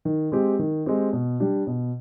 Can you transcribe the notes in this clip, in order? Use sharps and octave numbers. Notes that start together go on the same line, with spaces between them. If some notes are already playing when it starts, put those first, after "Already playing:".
D#3
G#3 C4 G4
D#3
G#3 C4 G4
B2
G3 D4 G4
B2